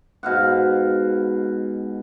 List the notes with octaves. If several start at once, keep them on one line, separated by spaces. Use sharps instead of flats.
G#2 B2 F5 F#5